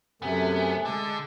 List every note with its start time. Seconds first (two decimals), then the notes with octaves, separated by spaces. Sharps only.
0.22 F#2 C3 A3 B3 A4 G#5
0.85 D3 G#3 A5